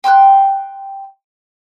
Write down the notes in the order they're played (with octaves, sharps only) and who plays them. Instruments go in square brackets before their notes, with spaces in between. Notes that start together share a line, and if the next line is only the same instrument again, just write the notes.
[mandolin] G5 C6 E6 F#6